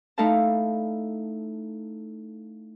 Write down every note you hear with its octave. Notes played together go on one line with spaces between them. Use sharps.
A3 D#4 E4 A4 F5 A5